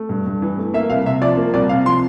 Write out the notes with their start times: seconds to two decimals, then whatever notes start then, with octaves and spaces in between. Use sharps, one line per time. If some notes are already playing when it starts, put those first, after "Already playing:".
Already playing: A3
0.09 G2
0.26 G2
0.42 E3
0.58 A3
0.74 A#3 E5
0.89 C2 F5
1.06 C3 E5
1.21 F3 D5
1.37 A#3
1.54 C2 D5
1.69 C3 F5
1.85 F3 C6